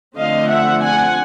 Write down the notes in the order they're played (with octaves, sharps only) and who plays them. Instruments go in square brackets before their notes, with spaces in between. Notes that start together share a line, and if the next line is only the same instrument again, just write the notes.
[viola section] D3 F3 A3 C4 D#5 F5
E5 F#5
F#5 G#5